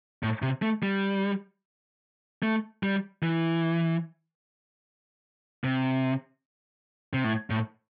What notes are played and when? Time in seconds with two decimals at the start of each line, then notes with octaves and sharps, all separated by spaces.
0.23 A2
0.42 C3
0.62 A3
0.83 G3
2.43 A3
2.83 G3
3.23 E3
5.64 C3
7.13 C3
7.24 A2
7.50 A2